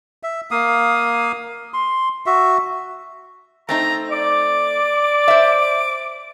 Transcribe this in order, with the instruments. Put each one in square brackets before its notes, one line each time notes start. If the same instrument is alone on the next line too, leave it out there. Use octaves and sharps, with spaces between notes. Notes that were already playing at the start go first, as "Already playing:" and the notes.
[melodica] E5
A#3 F5 D#6
C6
F#4 E5
[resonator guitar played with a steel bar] A3 C4 D#4 [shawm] A#5
[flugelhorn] D5 [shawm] D6
[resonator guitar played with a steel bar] C5 E5